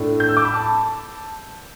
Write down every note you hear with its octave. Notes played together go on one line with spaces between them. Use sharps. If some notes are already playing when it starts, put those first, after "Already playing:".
Already playing: A2 A3 D4
G6
E6
D6
B5
A5